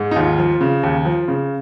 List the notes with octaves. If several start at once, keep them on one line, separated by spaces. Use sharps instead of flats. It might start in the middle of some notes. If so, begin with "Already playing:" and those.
Already playing: G#2
D#4
D#2 F4
F3
C#3
D#2
F3
C#3